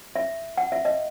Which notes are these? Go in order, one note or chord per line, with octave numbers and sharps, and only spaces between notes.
E5
F#5
E5
D#5